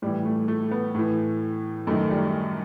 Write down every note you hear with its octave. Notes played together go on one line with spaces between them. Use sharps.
A2 E3 G3
A3
A3
B3
A2 E3 A3
F#2 D#3 A3
G3